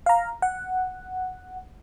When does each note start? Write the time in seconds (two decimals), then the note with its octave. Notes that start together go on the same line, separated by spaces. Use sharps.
0.06 F5 A#5
0.42 F#5